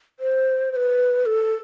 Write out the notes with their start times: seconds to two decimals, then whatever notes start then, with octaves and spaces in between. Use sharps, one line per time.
0.20 C5
0.72 C5
0.76 B4
1.26 A4